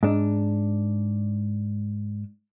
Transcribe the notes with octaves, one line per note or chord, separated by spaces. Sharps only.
G#2 D4